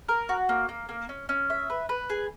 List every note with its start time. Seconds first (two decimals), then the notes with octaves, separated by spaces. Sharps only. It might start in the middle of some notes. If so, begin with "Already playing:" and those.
0.09 A#4
0.29 F#4
0.49 A#3
0.69 A#3
0.89 A#3
1.09 C#4
1.29 C#4
1.50 E5
1.70 B4
1.89 B4
2.10 G#4